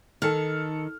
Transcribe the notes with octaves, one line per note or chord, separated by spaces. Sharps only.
D#3 A4 F6